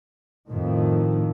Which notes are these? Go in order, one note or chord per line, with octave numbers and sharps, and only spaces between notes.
F2 A2 D#3